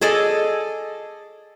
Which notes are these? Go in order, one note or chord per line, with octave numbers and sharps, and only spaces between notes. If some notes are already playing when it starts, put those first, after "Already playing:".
G#4 A4 D5 D#5